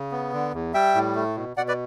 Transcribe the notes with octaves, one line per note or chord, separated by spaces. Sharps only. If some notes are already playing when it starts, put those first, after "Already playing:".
Already playing: C#3
B3
D3
E2
G3 E5 G5
A2
A3
B2
B2 D5 F#5
B4 D5